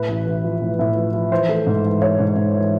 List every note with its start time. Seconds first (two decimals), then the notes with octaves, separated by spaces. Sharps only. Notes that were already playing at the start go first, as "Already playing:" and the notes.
Already playing: A2 B4
0.09 A1
0.27 A1
0.44 F3
0.62 A2
0.79 A2
0.96 F3
1.13 F3
1.32 E3 C5
1.49 A3
1.67 G#2
1.84 E3
2.01 E3 C#5
2.19 G#2
2.36 G#2
2.54 E3